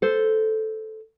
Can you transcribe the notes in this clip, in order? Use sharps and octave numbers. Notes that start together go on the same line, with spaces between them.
A4 C5